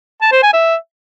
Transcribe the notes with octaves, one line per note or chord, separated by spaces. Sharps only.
A5
C5
G#5
E5